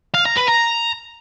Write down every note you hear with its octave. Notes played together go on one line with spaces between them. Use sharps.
F5
A#5
B4
A#5